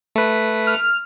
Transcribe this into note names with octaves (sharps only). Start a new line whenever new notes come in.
A3 B4
F6